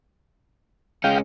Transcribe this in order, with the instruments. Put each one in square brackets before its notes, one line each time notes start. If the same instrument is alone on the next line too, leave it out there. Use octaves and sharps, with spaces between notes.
[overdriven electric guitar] G#3 C#4 [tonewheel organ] F5 G5